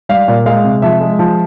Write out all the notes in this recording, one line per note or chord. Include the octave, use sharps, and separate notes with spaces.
G3 F5
A#2
G#3 F5
C3
F3 E5
G#3
F3